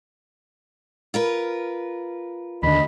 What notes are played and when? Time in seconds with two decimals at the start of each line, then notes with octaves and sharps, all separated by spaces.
1.14 F4 A#4 B4
2.63 D#2 D3 D#5 B5